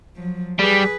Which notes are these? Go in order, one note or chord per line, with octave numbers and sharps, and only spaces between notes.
F3 F#3
G3 G#4 B4